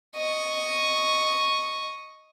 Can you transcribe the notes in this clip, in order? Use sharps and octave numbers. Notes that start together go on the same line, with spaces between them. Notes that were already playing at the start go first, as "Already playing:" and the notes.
D#5 C#6